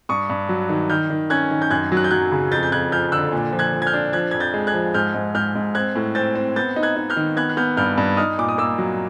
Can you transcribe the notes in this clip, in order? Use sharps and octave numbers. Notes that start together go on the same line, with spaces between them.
G2 C#6 D#6
G2
F#3
D#3
D#3 F6 G6
D#3
C#4 F#6 G#6
D#3
G6
F#2 F#6 G#6
F#3
F#6
G6
F#3 F#6 G#6
C#3
F2 G6 A6
G6
F2 F#6 G#6
F3 F6 G6
D3 E6 F#6
A#2
F3
F#6 G#6
F3
G#6
F6 G6
D4
F3 F#6 G#6
F2 G#6
G6 A6
G#3
F#6 G#6
F3
G#2 F6 G6
G#2
G#2 F6 G6
G#2
C4 F#6 G#6
A2
C4 G6 A6
C4
B3 G6 A6
D#4
F#6 G#6
D#4
F6 G6
D#3
B3 F#6 G#6
F#6
B3 F6 G6
G2 F6 G6
G2
D#4 D#6 F6
A#2 D6
D#6
A#3 D6 E6
F#3